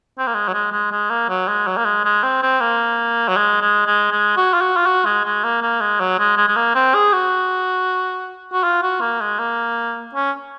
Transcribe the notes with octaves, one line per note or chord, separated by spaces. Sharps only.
C4
A#3
G#3
F#3
G#3
G#3
G#3
A#3
F#3
G#3
F#3
A#3
G#3
G#3
C4
C4
A#3
F#3
G#3
G#3
G#3
G#3
F#4
F4
F#4
F4
F#4
G#3
G#3
A#3
A#3
G#3
F#3
G#3
G#3
G#3
A#3
C4
G#4
F#4
F#4
F4
F#4
A#3
G#3
A#3
C#4